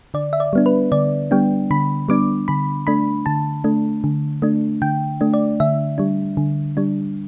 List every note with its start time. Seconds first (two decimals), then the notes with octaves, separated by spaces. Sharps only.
0.14 D3 D5
0.33 E5
0.40 D5
0.53 G3 B3 D4
0.66 B4
0.92 D3 D5
1.31 G3 B3 D4 G5
1.71 D3 B5
2.09 G3 B3 D4 D6
2.48 D3 B5
2.87 A3 D4 B5
3.26 D3 A5
3.64 A3 D4
4.04 D3
4.42 A3 D4
4.82 D3 G5
5.21 A3 D4
5.34 D5
5.60 D3 E5
5.98 G3 D4
6.37 D3
6.77 G3 D4